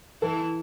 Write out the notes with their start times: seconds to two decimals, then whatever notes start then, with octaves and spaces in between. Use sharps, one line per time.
0.21 E3 E4 A4